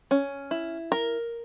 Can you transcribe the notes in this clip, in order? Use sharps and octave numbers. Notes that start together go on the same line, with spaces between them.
C#4
E4
A#4